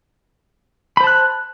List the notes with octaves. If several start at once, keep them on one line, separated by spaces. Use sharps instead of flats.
C5 A5 B5 F#6